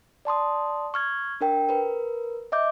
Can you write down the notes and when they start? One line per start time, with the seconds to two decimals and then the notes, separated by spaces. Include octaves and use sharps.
0.25 D5 A5 C6 D#6
0.94 C#6 F6 G#6
1.41 D4 A#4 G5
1.69 A#4 B4
2.52 D#5 E5 D6 G6